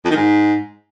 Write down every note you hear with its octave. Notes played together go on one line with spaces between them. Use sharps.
F2
D#3
G#2